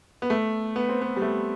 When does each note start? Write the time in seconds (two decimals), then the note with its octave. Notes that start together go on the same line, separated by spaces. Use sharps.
0.22 B3
0.30 A3
0.76 B3
0.89 C4
1.02 B3
1.16 G3
1.22 A3